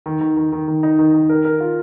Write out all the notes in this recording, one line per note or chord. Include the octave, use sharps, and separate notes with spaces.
D#3
D#3
D#3
D#3
D#3
D#4
D#3
D#3
A#4
A#4
F4